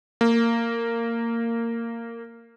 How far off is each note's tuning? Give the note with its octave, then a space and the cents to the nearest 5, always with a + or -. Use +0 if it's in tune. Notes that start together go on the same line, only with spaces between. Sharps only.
A#3 -15